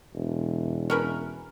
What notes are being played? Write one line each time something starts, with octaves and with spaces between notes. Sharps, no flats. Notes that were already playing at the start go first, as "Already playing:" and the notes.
E1
C#4 A#4 B4